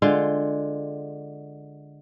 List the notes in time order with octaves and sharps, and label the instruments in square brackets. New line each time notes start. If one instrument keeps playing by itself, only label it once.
[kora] D3 G#3 F4